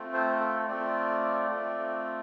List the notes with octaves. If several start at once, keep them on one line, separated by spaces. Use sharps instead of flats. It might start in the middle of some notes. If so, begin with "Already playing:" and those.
Already playing: A3 C4 F4
C5
A4
A3 C4 F4 D5
A3 C4 F4